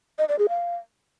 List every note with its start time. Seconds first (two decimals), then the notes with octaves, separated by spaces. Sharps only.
0.19 D#5
0.29 D5
0.39 G#4
0.49 F5